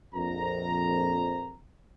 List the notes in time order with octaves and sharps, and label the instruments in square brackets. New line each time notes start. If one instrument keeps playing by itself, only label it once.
[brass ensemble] A#1 F2 A#5